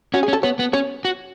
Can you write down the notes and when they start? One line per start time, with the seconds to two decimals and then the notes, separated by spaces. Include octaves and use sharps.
0.14 C#4 F#4
0.23 G#4
0.28 C#4
0.33 A4
0.43 B3 C#5
0.59 B3
0.73 C#4 C#5
1.05 F#4